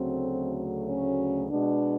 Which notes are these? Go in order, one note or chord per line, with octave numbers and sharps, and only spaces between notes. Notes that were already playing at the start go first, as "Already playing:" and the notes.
Already playing: D2 C#3 F#3 A3 C4
C#4
B2 G#3 B3 D4